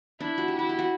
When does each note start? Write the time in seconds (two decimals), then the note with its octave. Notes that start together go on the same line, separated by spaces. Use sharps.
0.20 D4 E4
0.38 F#4
0.48 G4
0.56 E4 F#4
0.69 G4
0.79 F#4